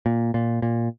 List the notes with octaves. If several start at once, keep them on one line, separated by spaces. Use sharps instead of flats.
A#2
A#2
A#2